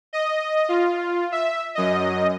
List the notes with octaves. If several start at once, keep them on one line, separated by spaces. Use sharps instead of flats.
D#5
F4
E5
F#2 D#5